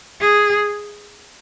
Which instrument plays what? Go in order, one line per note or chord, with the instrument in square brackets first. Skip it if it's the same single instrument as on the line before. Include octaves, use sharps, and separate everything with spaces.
[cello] G#4